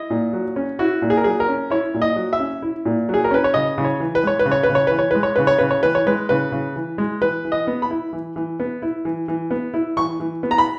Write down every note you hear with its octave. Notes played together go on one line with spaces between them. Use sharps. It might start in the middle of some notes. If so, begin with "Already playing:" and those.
Already playing: E4 D#5
A#2
F#3
C#4
E4 F#4
A#2
G#4
A#4
F#3 G#4
A#4
C#4
E4 C#5
A#2
D#5
F#3
E5
C#4
E4
A#2
F#3
G#4
A#4
C#4 B4
C#5
C#3 D#5
C#3
C#5
E3
B4
G#3 C#5
B4
C#3
C#5
B4
C#3
C#5
E3 B4
C#5
G#3 B4
C#5
C#3 B4
C#5
C#3 B4
C#5
E3 B4
C#5
G#3 B4
C#3 B4
C#3
E3
G#3
E3 B4
E3
D#5
B3
B5
E4
E3
E3
B3
E4
E3
E3
B3
E4
E3 C#6
E3
B3
A#5
B5